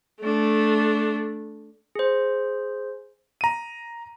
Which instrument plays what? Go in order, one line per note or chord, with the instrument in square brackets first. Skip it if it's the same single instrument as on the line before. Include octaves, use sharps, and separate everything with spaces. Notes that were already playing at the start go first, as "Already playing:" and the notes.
[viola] A3 D4
[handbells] G#4 C5
[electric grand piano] A#5 D#7